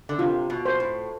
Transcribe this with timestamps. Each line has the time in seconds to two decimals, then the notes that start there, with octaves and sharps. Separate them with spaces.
0.09 D3
0.19 C3 F4
0.50 B2
0.65 C5
0.80 A2